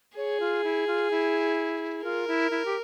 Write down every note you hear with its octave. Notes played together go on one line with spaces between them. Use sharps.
G#4 C#5
F4
E4
F4
E4
F4 A#4
E4
E4
G4